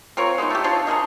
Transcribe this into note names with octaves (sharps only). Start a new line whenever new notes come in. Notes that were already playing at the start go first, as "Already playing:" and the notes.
C4 F4 A#4 C#5
G#3 B3 C#4 D#4
A3 G4
D4 F4 C#5 A5
D4 G#4 A#4 D#5